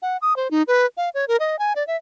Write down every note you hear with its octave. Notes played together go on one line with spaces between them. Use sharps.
F#5
D#6
C5
D#4
B4
F5
C#5
A#4
D#5
G#5
D5
E5